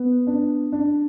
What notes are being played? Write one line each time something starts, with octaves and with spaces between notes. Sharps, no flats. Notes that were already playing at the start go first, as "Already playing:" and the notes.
Already playing: B3
D4
D4